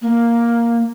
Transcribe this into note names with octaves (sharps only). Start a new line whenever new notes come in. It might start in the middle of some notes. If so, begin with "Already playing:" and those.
A#3